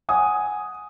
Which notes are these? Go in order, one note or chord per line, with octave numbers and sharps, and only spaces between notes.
F#5 G#5 D#6